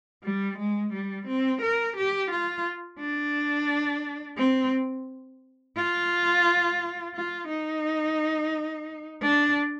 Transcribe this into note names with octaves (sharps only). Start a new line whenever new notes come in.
G3
G#3
G3
C4
A#4
G4
F4
D4
C4
F4
F4
D#4
D4